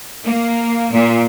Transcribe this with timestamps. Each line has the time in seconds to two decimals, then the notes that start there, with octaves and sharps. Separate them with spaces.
0.25 A#3
0.92 A#2